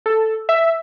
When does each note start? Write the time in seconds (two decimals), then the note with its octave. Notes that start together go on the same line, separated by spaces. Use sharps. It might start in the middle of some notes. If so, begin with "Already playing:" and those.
0.06 A4
0.49 E5